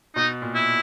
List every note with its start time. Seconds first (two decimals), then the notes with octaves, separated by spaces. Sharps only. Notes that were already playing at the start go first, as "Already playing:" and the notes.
0.15 B2 D#4
0.42 A#2
0.55 E4